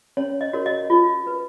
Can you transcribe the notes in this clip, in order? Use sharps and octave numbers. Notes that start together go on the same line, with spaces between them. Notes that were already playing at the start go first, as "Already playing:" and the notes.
C#4 C#5
D#5
F#4 A#4 C#5
D#5
F4
B4